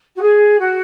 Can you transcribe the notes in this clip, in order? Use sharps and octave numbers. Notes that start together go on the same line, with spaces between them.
F#4
G#4
F#4